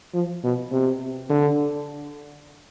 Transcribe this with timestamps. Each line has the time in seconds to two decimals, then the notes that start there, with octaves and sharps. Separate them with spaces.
0.14 F3
0.44 B2
0.72 C3
1.30 D3